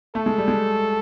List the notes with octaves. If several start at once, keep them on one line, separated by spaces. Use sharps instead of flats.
A3 A4
G#3
G3
G#3